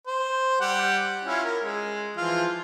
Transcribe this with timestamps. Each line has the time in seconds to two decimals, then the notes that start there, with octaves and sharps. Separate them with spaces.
0.07 C5
0.61 G3 G4 F#5
1.25 C#4 E4 F4
1.44 A#4
1.63 G#3
2.17 E3 F3 F4